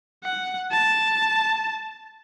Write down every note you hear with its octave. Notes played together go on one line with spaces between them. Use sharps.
F#5
A5